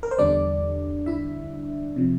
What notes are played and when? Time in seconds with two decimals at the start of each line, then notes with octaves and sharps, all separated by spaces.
0.03 A#4
0.11 C5
0.18 E2 D3 G3 D4 D5
1.06 E4 E5
1.96 C3 F3